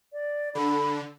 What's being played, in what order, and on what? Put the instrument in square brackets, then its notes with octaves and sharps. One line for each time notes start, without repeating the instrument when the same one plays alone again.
[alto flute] D5
[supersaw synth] D3 [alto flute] B5